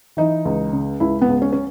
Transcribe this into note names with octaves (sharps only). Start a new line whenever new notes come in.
E3 D#4
C#2
C#3
C#2 E4
B3
C#2
C#4
C#4